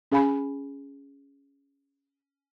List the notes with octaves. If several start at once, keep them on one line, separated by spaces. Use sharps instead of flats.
C#4 G#4 F5 G#5 B5